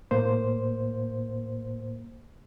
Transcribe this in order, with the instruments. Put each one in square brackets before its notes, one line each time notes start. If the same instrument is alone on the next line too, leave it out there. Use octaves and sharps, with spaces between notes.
[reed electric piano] A2 A#3 C5